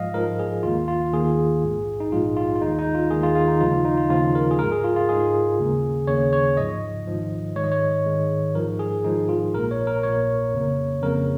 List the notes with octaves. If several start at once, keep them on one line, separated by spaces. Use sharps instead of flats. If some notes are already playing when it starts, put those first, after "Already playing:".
Already playing: G#2 F3 G#3 D#5 F5
G#2 F3 G#3 A#4
G#4
D#2 D#3 A#3 F4
F4
D#2 D#3 A#3 G#4
A#1 G#2 G#3
D#4
A#1 G#2 G#3 F4
F4
F4
D#2 D#3 G#3 D#4
D#4
F4
D#2 D#3 G#3 G#4
F4
F4
D#4
D#2 C#3 F3 F4
D#4
D#4
F4
D#2 C#3 F3 F4
A#4
G#4
G#2 G#3 A#4
G#4
F4
F4
G#2 G#3 G#4
D#2 C#3 A#3
D#2 C#3 A#3 C#5
C#5
G#1 G#2 F3 D#5
G#1 G#2 F3
G#2 D#3 G#3 C#5
D#5
C#5
G#2 D#3 G#3
G#1 G#2 F3 G#3 A#4
G#4
G#1 G#2 F3 G#3 D#4
F4
A#1 A#2 A#3 A#4
C#5
A#4
A#1 A#2 A#3 C#5
F2 C#3 A#3
F2 C#3 A#3 A#4